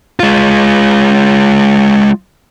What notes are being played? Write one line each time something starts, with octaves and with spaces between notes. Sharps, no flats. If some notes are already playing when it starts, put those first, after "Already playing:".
G#3 F4